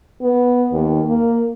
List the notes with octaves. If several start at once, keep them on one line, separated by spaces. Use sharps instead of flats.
B3
D#2
A#3